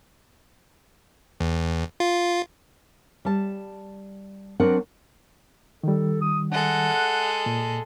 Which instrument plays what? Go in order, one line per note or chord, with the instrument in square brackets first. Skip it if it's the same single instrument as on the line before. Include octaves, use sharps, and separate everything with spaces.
[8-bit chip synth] E2
F4
[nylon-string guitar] G3 A5
F#3 C4 D4 A#4 F#5
[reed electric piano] D#3 G3 [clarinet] A4
[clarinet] D#6
[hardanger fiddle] G#3 A4 [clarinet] F#5
[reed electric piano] F#6
A#2